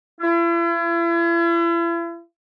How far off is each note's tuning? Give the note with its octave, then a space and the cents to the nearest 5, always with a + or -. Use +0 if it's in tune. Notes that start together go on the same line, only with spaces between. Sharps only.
E4 +40